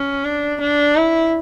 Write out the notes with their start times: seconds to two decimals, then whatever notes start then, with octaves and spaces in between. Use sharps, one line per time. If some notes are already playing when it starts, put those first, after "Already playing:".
Already playing: C#4
0.25 D4
0.61 D4
0.96 E4